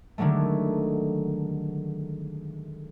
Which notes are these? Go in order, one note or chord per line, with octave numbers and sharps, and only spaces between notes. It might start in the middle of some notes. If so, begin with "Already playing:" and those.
D3 D#3 F#3 G#3 A3